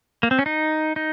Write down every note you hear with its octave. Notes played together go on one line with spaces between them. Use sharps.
A#3
C4
C#4
D#4
D#4